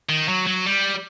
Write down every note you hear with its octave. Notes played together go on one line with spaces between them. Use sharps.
D#3
F#3
F#3
G3